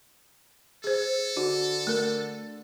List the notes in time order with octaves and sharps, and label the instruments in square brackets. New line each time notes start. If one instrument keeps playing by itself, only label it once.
[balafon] G#4 C5 [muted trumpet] A4
[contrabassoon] D3 [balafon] F#4
[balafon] A3 A#4